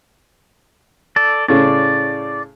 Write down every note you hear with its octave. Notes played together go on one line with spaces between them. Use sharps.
A4 D5
A2 C#3 D5